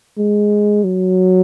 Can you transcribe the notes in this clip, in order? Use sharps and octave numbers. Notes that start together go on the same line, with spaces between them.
G#3
F#3